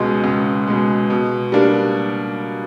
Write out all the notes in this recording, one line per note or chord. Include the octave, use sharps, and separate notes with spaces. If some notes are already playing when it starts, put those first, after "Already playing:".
Already playing: C#2 B2 G#3
C#2
B2 G#3
B2
G3 A#3 D4